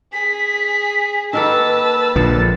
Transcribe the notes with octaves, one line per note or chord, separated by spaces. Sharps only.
G#4 B6
D#3 A#3 A4 B4 A5 E6
A#1 D3 F3 A6